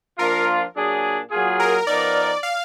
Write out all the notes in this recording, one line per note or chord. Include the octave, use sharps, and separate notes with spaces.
F3 A#3 D4 F4 A#4
A#2 F#3 D4 G#4
A#2 F#3 A#3 F4 G#4
A#4
F3 B3 D#4 A#4 D5
F5